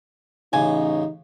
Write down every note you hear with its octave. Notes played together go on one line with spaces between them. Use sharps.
A1 C#3 D#4 G#5